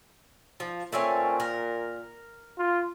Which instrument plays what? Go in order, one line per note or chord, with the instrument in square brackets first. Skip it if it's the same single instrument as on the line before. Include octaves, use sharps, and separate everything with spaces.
[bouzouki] F3
[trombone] A#2 [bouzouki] A3 C4 C#4
[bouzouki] A#4
[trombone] F4